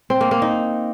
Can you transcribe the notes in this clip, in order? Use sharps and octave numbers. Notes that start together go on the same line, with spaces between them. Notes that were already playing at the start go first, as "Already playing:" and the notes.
C4
A#3
A#3
D#4